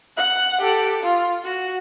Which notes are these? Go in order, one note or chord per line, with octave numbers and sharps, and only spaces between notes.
F#5 F#6
G4 A4
F4
F#4